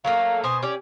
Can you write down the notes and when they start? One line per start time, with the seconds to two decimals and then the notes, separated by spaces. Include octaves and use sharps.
0.05 F#3 A3 A#3 F5
0.44 B2 C5 G#5 D#6
0.62 C#4 G4 D5